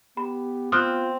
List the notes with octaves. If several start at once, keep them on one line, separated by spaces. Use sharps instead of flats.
B3 G4 B5
C4 F4 D#6 F6 F#6